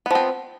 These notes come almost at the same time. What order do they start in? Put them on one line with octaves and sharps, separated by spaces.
B3 F3 C4